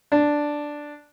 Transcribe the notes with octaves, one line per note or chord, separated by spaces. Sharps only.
D4